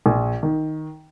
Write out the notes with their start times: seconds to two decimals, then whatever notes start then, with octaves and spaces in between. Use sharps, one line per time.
0.06 A#1
0.43 D#3